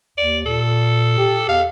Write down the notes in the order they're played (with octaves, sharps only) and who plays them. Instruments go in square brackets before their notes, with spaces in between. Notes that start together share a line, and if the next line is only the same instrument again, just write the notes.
[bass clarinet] D#2 [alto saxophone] D5
[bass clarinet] A#2 [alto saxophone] A4
[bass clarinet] G4
[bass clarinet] E2 [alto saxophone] F5